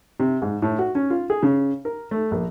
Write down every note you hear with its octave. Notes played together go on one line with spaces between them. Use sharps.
C3
G#2
A2
F#4
C#4
F4
G#4
C#3
A#4
A3
A#1